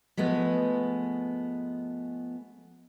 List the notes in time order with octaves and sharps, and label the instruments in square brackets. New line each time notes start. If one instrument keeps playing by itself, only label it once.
[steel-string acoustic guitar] F3 G#3 A3 B3